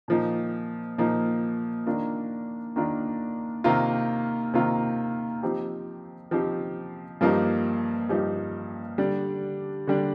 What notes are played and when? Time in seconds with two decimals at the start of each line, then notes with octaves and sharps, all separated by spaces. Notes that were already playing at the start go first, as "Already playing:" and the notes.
0.08 A#2 F3 A#3 D#4
0.98 A#2 F3 A#3 D#4
1.86 D#3 A#3 D4 F4
2.76 D#3 A#3 D4 F4
3.64 C3 D#3 A#3 F4
4.54 C3 D#3 A#3 F4
5.43 F3 C4 D#4 G4
6.31 F3 C4 D#4 G4
7.21 G2 F3 A#3 D#4 G4
8.09 G2 F3 A#3 D#4 G4
8.98 D3 G3 D4
9.87 D3 G3 D4